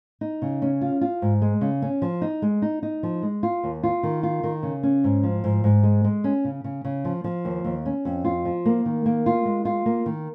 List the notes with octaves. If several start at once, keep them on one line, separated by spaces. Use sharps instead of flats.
D#4
C#3
C#4
F4
F4
G#2
G#3
C#3
C#4
F3
D#4
G#3
D#4
D#4
F3
G#3
F4
D#2
F4
D#3
F4
D#3
C#3
C#4
G#2
F3
G#2
G#2
G#3
G#3
C#4
C#3
C#3
C#3
F3
F3
D#2
D#2
C#4
F2
F4
F3
A#3
D#3
A#3
F4
G#3
F4
A#3
D#3